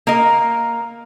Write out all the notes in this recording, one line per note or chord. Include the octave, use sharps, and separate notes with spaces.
A#3 D#5